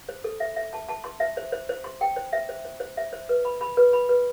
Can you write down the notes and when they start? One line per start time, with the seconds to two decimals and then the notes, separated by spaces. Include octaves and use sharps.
0.09 C5
0.24 A4
0.40 E5
0.56 E5
0.73 A5
0.88 A5
1.04 C6
1.20 E5
1.37 C5
1.52 C5
1.69 C5
1.84 C6
2.01 G5
2.16 C5
2.33 E5
2.49 C5
2.65 C5
2.80 C5
2.97 E5
3.13 C5
3.29 B4
3.45 B5
3.61 B5
3.77 B4
3.93 B5
4.09 B4